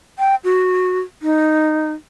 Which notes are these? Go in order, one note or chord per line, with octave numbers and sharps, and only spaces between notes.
G5
F#4
D#4